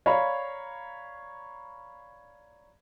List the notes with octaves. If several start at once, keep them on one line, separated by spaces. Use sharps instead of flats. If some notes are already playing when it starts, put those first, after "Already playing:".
C#5 D5 F5 A#5 B5